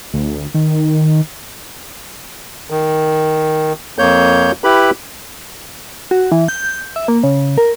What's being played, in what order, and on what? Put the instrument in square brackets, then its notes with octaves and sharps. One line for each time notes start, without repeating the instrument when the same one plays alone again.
[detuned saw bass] D2
D#3
[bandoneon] D#3
F2 A#3 C#5 G6
E4 G4 B4 B5
[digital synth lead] F#4
E3
G6
E5
A#3
C#3
A#4